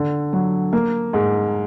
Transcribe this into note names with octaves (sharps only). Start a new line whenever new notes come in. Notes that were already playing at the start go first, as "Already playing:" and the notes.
Already playing: D3
F#3
A#3
G#2